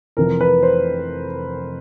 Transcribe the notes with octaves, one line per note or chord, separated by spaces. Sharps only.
F1 F2 C3 E3 A#4
B4
C5